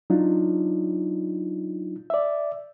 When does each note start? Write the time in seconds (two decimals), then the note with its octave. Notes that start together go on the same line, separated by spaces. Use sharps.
0.10 F#3 D4 D#4 F4
2.10 D5 E5